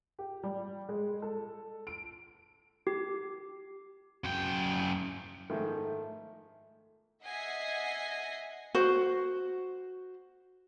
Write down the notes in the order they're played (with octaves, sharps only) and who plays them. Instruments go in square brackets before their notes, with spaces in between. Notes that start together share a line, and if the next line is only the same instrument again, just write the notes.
[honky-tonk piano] G4
G3
G#3
A4
D7
[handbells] G4
[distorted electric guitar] F#2 G5
[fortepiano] G#2 D#3 F3 [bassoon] A3
[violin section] D#5 E5 F#5 G#5 A#6 C7
[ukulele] F#4 C5